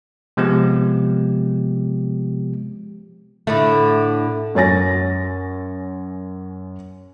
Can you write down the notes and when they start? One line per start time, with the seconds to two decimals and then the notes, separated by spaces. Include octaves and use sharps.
0.37 C3 F3 G#3 B3 G4
3.47 A2 D3 A3
4.55 F#2 C#5 G#5 A6 A#6